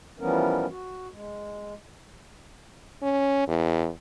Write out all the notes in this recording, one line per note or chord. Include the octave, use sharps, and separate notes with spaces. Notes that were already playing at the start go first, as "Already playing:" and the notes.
E3 F3 G3 B3 C#4 A#4
F#4
G#3
C#4
E2